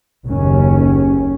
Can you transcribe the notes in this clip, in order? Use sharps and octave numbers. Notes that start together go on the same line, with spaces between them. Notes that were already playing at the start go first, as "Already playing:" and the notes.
F#1 D#2 C#4